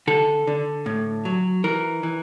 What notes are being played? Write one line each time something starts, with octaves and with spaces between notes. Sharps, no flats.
D3 A4
D3
A2
F#3
E3 A#4
E3